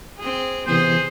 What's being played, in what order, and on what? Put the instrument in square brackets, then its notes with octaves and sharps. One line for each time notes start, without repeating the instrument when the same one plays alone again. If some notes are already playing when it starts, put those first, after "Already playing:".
[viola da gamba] C4 G#4
[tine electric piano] C3 E3 B3 [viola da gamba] G#4 [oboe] C5